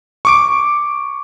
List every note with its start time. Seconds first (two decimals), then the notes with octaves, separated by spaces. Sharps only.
0.25 C#6 D6 D7